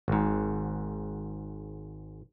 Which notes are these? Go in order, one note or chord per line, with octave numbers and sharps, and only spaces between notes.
G#1 G#2